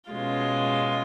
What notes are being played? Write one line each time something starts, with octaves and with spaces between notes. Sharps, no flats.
B2 G#3 C#4 F4